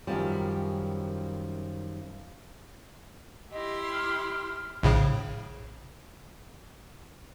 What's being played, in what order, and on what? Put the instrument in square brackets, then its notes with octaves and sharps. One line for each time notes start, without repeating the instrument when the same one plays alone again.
[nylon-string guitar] F#2 D#3 F3 G3
[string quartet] E4 G4 C6 [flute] D#5
[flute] F6
[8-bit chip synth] A#1 A2 C#3